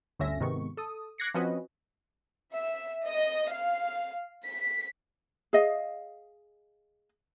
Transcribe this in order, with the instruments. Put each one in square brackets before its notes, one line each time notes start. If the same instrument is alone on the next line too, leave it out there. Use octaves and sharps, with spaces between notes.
[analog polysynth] G1 D2 D3 C#4 E5 A#6
G#2 C3 D#3 B3 C#6
A4 D#6
D6 F#6 G#6 A#6 C7 C#7
F3 C4 C#4 F#4 B4 D#5
[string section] E5
D#5
F5
B6
[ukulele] G#4 D#5 F5